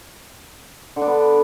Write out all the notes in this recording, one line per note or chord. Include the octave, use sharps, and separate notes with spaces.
D3
D4
B3